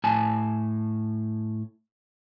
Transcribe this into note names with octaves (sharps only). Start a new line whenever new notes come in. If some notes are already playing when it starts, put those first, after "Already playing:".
A2 G#5 A5